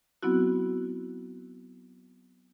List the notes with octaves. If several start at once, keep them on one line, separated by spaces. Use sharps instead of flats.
F#3 B3 C4 E4 F#4